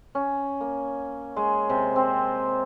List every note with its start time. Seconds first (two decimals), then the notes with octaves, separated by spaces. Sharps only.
0.15 C#4
0.61 A#3
1.36 G#3
1.69 C3
1.96 C4